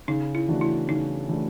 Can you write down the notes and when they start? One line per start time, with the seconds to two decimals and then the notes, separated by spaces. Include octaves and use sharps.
0.08 C#3 D#4
0.35 E4
0.48 E3 A3 D4 F#4
0.61 E4
0.88 C#3 D#4
1.29 E3 A3 D4 F#4